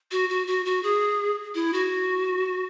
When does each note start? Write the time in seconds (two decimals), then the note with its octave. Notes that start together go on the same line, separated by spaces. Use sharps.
0.12 F#4
0.29 F#4
0.47 F#4
0.65 F#4
0.83 G#4
1.55 E4
1.73 F#4